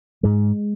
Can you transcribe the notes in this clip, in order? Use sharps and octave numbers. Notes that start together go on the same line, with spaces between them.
G#2 G#3